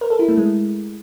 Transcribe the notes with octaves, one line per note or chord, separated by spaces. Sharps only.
A#4
A4
E4
A3
G#3